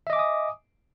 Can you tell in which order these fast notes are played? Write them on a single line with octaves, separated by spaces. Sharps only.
E5 D#5 D6 G#5 D#6